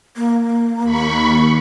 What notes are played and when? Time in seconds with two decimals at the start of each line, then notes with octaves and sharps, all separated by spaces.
0.16 A#3
0.83 D#2 B5 C#6